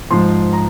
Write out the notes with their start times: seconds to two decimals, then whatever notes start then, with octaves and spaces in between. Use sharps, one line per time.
0.10 G#2 F3 C6
0.53 A#5